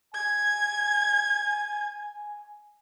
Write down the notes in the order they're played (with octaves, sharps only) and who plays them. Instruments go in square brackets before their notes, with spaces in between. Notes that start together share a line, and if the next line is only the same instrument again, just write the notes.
[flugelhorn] G#5 [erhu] G#6